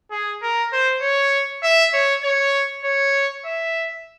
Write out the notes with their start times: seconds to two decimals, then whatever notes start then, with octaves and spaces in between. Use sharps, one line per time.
0.11 G#4
0.43 A#4
0.73 C5
1.02 C#5
1.63 E5
1.94 C#5
2.24 C#5
2.84 C#5
3.45 E5